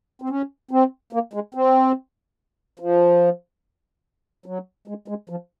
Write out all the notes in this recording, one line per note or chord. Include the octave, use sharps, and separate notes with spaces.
C4
C#4
C4
A#3
G#3
C4
F3
F#3
G#3
G#3
F3